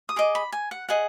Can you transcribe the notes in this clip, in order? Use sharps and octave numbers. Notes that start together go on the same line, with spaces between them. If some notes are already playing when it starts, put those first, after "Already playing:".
D#6
G#4 D#5 D6
B5
G#5
F#5
G#4 D#5 F#5